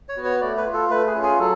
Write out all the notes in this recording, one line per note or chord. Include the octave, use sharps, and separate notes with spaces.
C#5
B3 F#4
C#5
A3 D5
B4
F4
A4
A3 B4
G#4
C#4 F4
G#4
F#3 A4